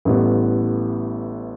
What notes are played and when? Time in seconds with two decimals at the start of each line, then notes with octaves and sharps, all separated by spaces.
0.05 A1 A2 G3 B3